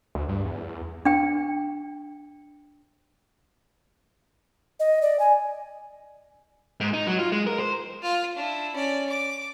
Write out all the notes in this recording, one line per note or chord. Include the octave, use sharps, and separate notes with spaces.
D2
G2
E2
D4 G5
D#5
D5
G#5
G#2
D#4
F#3
F4
G#3
A#4
C5
F4 F5
D4 E4
C#4 D5
D6